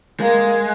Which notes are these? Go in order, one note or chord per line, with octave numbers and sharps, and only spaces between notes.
G#3 A#3